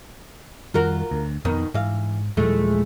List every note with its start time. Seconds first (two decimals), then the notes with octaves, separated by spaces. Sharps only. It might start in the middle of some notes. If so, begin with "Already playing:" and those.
0.74 F2 D#3 G3 F4 F#4 A#4
1.11 D2
1.45 F2 B2 D#3 B3
1.74 G#2 E3 F5
2.37 D#2 A#2 E3 F3 G#3 A3